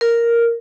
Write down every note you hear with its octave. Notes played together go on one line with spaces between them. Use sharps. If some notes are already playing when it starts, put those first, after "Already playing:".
A#4